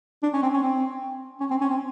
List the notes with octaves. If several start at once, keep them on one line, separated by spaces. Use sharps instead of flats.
D4
C#4
C4
C#4
C4
C#4
C4
C#4
C4